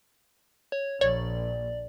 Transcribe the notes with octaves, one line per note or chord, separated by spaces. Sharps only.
C#5
A#1 C#5 D5